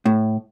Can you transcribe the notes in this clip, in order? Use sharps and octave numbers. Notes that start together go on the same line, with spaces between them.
A2